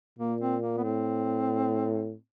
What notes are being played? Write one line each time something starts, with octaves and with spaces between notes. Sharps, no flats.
A#2 A#3
C4
A#3
B3
A2 C4